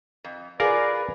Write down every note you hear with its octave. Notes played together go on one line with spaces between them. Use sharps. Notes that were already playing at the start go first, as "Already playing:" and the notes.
F2
F4 G#4 A#4 B4 D5